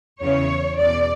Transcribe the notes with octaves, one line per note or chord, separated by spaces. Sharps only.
E2 C#3 E3 C#5
E2 B2 D5